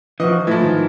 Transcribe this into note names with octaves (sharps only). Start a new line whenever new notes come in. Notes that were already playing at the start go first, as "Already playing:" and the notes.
E3 F3 F#4 D#5
A2 E3 F3
G#2 D#3